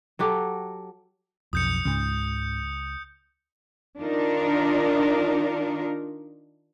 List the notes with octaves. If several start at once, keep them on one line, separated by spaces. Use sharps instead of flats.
F#3 F#4 G4 A4
B1 F2 D#6 G6 C#7
C#2 G#2 C#3
D#3 D4 D#4 F4 A#4